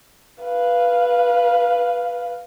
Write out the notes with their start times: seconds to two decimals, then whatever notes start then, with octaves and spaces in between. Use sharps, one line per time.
0.43 B4 F5